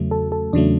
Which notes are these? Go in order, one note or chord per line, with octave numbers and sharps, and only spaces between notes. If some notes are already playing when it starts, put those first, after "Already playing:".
Already playing: E2 C#3 F#3 A3
A4
A4
E2 C#3 F#3 A3 D4